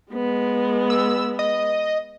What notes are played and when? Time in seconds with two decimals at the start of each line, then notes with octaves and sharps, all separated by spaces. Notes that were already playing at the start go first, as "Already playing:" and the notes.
0.12 G#3 B3
0.90 E6
1.39 D#5